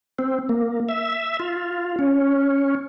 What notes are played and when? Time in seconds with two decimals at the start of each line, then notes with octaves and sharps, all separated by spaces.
0.19 C4
0.49 A#3
0.89 E5
1.40 F4
1.99 C#4